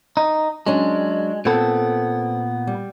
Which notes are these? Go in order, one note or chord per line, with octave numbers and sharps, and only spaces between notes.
D#4
F#3 G#3 C#4 D4
A#2 B3 C4 A4
G3